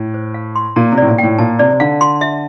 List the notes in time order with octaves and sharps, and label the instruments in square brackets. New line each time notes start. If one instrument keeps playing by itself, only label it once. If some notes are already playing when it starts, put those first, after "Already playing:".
Already playing: [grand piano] A2
[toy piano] C5
F5
C6
[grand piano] A#2 [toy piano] A#5
[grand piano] C3
[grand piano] A2 [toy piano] D5
[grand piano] A#2
[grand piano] A2 [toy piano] G5
[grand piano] A#2 [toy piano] A5
[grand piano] C3 [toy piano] D5
[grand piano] C3
[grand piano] D3 [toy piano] F5
[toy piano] C6
E5